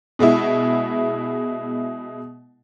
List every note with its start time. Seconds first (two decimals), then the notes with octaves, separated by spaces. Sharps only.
0.19 B2 G#3 B3 E4